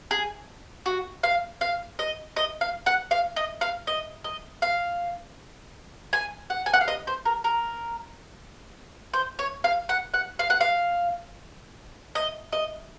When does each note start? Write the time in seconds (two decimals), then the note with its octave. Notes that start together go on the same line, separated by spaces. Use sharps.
0.11 G#4
0.86 F#4
1.23 F5
1.61 F5
1.99 D#5
2.36 D#5
2.61 F5
2.86 F#5
3.11 F5
3.36 D#5
3.61 F5
3.87 D#5
4.24 D#5
4.62 F5
6.13 G#5
6.50 F#5
6.66 G#5
6.73 F#5
6.81 F5
6.88 D#5
7.07 C5
7.25 A#4
7.44 A#4
9.13 C5
9.39 C#5
9.64 F5
9.89 F#5
10.14 F#5
10.39 F5
10.50 F#5
10.61 F5
12.15 D#5
12.52 D#5